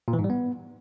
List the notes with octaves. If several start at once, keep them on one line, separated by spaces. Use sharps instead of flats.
A#2
E3
G#2
G3
B3